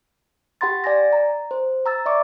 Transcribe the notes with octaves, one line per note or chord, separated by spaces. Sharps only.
G4 F#5 B5 C6 A6
D5 G#5 A6 A#6
A#5
C5
A#5 E6 A6
D5 E5 C#6 D6